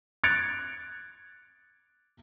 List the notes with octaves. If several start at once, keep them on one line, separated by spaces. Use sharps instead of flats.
F#6 G#6 A6 C#7 D7 F7